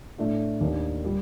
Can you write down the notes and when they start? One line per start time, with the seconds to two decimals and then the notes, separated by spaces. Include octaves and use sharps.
0.18 A2 A3 D4 F4 A4
0.60 D#2 D#3 A#3 D4
1.04 A#2 G3